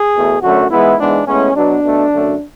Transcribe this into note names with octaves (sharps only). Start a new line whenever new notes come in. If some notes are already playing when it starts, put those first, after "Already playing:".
Already playing: G#4
E2 B2 A3
F#2 D3 F#3 A3 F#4
G#2 E3 G#3 B3 E4
G#2 E3 G#3 B3 D4
A2 G#3 B3 C#4
B2 F#3 B3 D4
B2 A3
F#2 D3 F#3 A3